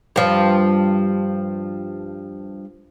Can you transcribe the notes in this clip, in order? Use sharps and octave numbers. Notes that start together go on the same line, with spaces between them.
G2 F3